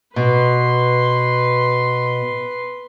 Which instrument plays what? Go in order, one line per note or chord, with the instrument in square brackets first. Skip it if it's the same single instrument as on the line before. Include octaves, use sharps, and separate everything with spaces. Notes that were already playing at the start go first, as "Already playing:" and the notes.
[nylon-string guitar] B2 [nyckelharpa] B4 C6